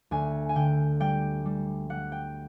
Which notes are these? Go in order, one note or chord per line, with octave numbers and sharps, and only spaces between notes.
D2 G#5
G#5
D3 G5
G3 G5
G3
G3 F#5
G5